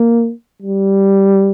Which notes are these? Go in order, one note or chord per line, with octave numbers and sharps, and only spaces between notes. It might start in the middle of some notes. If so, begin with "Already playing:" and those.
Already playing: A#3
G3